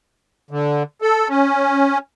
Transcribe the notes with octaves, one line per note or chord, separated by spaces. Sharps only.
D3
A4
C#4